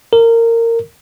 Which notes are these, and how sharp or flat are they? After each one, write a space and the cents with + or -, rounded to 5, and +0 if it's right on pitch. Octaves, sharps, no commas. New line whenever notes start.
A#4 -20